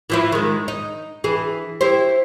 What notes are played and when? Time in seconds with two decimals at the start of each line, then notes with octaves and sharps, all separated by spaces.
0.10 E3 F3 E4
0.32 D#3 G#3
0.68 D#4
1.24 E3 G#4
1.81 E4 G4 C5